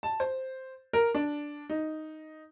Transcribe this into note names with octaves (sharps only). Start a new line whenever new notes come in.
A5
C5
A#4
D4
D#4